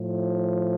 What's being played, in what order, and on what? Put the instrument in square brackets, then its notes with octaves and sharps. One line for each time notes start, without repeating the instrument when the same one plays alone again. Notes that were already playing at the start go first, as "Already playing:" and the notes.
Already playing: [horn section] A2 F3